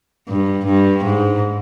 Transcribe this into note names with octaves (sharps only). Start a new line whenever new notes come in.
G2
G2
G#2